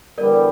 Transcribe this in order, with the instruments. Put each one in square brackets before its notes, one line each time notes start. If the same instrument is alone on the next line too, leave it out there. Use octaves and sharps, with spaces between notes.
[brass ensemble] E2 D3 G3 [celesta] A#4 D5